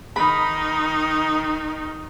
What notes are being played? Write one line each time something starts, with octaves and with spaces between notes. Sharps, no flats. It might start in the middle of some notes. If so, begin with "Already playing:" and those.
D#3 D#4 B5